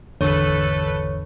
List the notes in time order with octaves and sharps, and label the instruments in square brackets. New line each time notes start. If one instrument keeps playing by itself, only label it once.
[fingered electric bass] G#1 E2 [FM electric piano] D3 [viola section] A4 B4 [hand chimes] C#5 C#6